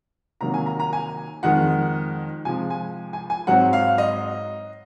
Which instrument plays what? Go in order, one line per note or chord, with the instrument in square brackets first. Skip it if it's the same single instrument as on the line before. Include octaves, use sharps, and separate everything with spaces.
[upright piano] C3 D#3 F#3 A#3 A#5
G#5
A#5
A#5
G#5
F2 D#3 G#3 F#5
C3 F3 G#3 G#5
G#5
G#5
G#5
G#2 F#3 C4 F#5
F5
D#5